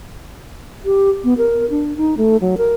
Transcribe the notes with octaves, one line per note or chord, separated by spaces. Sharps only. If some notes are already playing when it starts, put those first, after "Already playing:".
G4
B3
A#4
D4
D#4
A3
F#3
A#4